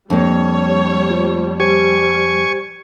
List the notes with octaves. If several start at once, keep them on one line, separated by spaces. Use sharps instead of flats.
F2 G3 A#3 D4 C#5
A3 F4 C5
G3 G4 C5 G#5 C#6